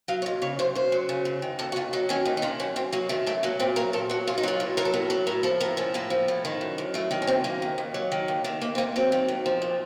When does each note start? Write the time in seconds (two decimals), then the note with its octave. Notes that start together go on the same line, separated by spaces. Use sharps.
0.08 F#3 F5
0.22 C#5
0.26 A#2 D#5
0.42 C#3 C#5
0.59 F#2 C5
0.75 F#2 C5
0.92 F#3
1.09 C#3
1.25 F#2
1.42 D#3
1.59 D#2 A4
1.72 F#4
1.76 D#2 F4
1.93 F#3 D#4
2.09 D#3 C#4
2.25 D#2 D#4
2.37 D#4
2.42 D#3 F4
2.60 F#2 C#4
2.76 F#2 C4
2.93 F#3 A#3
3.09 D#3 A3
3.26 F#2 A3
3.43 F#3 A#3
3.60 A#2 C4
3.76 F#3 A#4
3.93 A#2 A4
4.10 F#3 F#4
4.27 A#2 F4
4.38 D#4
4.43 F#3 F4
4.60 A2
4.77 F#3 A#4
4.85 A4
4.94 A2 F#4
5.10 F#3 A4
5.27 A2 A#4
5.43 F3 A4
5.60 A2 A#4
5.77 F3 C#4
5.94 A2 A#3
6.10 F3
6.28 A2
6.45 D#3
6.61 F#2
6.78 F#2
6.94 F#3 A3
7.11 D#3 A#3
7.22 C#4
7.27 F#2 C4
7.44 D#3 A#3
7.62 D#2
7.78 D#2
7.94 F#3
8.12 D#3
8.28 D#2
8.44 D#3 A3
8.62 D#2 A#3
8.75 C4
8.78 D#2 A#3
8.96 F#3 C4
9.12 D#3
9.28 D#2
9.46 F3
9.62 A#2